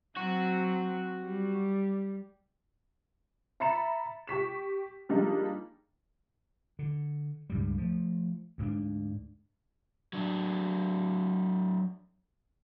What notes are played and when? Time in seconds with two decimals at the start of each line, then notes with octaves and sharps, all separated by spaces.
0.17 F#3 C4 F#4
1.23 G3
3.60 E5 A#5 B5 A6 C#7 E7
4.27 G4 C#6 B6 E7
5.09 F3 G3 G#3 A#3 D4 D#4
6.79 D3
7.50 C#2 G2 G3
7.78 F3 A3
8.58 D2 G#2 G3 D4
10.13 F#3 D4